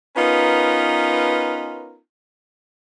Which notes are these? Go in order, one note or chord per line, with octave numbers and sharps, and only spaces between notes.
B3 C#4 D#4 F4 A#4 B4